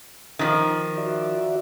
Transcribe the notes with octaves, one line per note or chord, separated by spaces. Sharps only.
D#3 F3
F#4 D5 E5